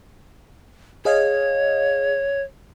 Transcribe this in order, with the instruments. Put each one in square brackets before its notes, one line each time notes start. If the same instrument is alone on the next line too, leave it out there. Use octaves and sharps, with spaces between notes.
[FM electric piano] G#4 D#5 F5 [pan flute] C#5